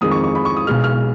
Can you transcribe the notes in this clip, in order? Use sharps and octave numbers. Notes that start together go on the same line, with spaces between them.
F2 D#3 G#3 D#6
C#6
C#6
B5
C#6
D#6
B1 B2 G#3 F6
F6